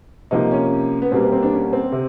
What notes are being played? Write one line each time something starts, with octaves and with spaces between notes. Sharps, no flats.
C3 F3 A#3 D#4
C#4
B3
B2 G3 A#3 C4
B3
C4
D4
C#4
C4
C3